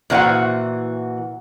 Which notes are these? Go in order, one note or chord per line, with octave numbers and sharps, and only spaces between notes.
A#2 E3 F#4 C5 F#5